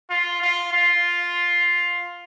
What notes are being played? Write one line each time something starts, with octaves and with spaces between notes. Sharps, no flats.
F4
F4
F4